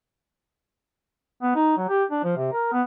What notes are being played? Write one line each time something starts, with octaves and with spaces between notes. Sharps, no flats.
B3
D#4
F#3
G4
D4
F3
C3
A#4
B3